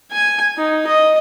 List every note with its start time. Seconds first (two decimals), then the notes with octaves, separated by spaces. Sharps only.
0.11 G#5
0.57 D#4
0.87 D#5